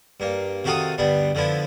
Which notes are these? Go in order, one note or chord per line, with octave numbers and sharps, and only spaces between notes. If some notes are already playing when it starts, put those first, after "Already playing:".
G2 A#3
C3 D#3 F#4 A4 F5 D#6
D2 G2 G3 B3 D4
D3 F3 B3 E4